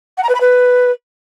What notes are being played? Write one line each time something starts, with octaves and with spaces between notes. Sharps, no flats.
F#5
A#5
B4
B5
B4